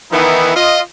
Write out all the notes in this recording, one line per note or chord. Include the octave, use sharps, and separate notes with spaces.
D#3 E3 B3 D#4 E4
F4 D#5